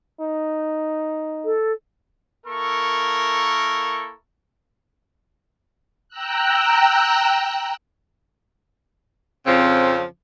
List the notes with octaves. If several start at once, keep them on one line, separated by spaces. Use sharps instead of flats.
D#4
A4
A#3 E4 A4 A#4 C#6
G5 A#5 E6 F#6
F2 C#3 F3 C4